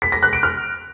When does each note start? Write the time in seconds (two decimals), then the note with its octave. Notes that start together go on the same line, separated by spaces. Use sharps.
0.02 B6
0.12 A#6
0.23 F#6
0.33 D7
0.43 F6